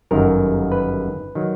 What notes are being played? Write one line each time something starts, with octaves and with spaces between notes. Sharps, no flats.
G1 F#2 D#3 A#4
B4
D#3 F#3